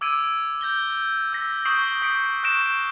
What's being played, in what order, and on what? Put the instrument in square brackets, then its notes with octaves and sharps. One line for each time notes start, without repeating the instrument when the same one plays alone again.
[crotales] D6 E6 G#6 D7 D#7
G6 A#6 G7
E6 A#6 B6
C#6 D#6 G6 C7 D7 G7
D#6 B6 C#7 D7
C#6 F#6 A#6 D7 E7